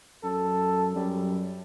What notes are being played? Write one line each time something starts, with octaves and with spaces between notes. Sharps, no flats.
F#2 A4
F#2 G3